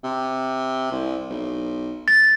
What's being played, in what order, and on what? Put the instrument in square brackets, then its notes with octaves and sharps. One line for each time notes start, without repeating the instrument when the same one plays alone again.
[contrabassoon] C3
C2
B1
[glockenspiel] A6